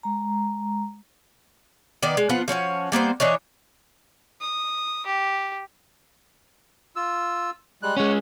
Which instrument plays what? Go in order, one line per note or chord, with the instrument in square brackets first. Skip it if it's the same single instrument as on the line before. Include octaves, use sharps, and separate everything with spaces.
[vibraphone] G#3 A#5
[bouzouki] D#3 B3 D5
G#3
F3 B3 F4 F#5
F3 C#4 F#4 C#5
G3 A#3 B3 C5
E3 D4 D#4 C#5
[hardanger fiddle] D#6
G4
[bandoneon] F4 E6
G3 G#3 F#6
[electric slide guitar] G#3 C#4 [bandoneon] C#5 F#5